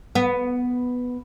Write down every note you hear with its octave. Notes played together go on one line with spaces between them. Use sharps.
B3